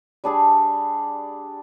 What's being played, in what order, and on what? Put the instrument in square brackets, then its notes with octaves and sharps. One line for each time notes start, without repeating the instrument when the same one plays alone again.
[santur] G3 D4 G#4 D5